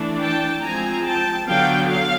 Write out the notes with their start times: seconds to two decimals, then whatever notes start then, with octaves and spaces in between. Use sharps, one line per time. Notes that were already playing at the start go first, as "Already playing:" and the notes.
Already playing: E3 A3 D4
0.20 G5 A5
0.62 F3 G#3 C4 G#5 A#5
1.05 G5 A5
1.46 D3 F#3 B3 F5 G5
1.88 F5